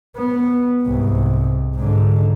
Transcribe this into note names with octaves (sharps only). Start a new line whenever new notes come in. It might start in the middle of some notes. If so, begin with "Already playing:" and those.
B3
C2 G#2
G#2 D3